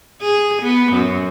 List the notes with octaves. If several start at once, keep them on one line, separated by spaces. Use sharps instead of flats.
G#4
B3
F#2